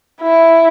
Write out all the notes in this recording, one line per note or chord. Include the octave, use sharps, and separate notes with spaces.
E4